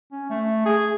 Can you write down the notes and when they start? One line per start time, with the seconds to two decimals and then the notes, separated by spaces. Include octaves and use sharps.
0.12 C#4
0.30 A3
0.66 G#4